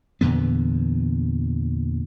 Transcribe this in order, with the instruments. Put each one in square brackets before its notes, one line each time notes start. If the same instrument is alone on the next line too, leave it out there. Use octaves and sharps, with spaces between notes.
[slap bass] E2 A#2 D3 B3